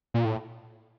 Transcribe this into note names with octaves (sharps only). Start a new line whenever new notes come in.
A#2
A2